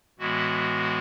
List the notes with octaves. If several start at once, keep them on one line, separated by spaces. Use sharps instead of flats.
A2 E3 G#3 B3 F#4